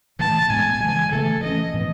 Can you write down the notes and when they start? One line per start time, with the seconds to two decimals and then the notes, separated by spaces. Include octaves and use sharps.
0.19 A2 E3 A3 A5
0.49 A2 G#3 B3 G#5
0.80 C#3 E3 G#3
1.11 C#3 E3 A3 A4
1.42 E3 A3 C#4 D#5
1.74 A2 E3 B3